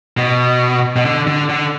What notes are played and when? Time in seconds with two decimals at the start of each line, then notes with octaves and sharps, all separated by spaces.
0.17 B2
0.96 B2
1.05 D3
1.27 D3
1.49 D3